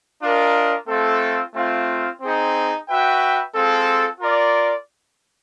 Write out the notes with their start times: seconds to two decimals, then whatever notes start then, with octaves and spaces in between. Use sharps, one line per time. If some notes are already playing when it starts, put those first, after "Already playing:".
0.23 D4 F4 A#4 D#5
0.88 A3 C4 F4 A4
1.55 A3 C4 F4
2.21 C4 D#4 G#4
2.88 F#4 B4 E5 G5
3.54 G#3 C4 F4 A4
4.21 F4 A#4 D5